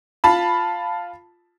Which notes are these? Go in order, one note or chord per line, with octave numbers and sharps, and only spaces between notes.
F4 A5 B5